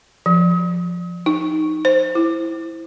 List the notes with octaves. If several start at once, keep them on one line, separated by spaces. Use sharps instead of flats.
F3
D#4
C5
E4